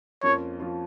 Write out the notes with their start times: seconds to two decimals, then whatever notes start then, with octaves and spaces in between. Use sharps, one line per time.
0.23 F2 F3 A#3 C#4 F4 C#5
0.60 F3 A#3 C#4 F4